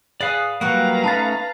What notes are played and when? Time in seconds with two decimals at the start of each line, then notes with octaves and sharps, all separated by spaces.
0.20 G#4 B4 D5 F5 F#5 D#6
0.61 F#3 G3 A#3 B4 F5 F#5 A#5 C#6
1.04 A3 C#4 D#4 A5 A6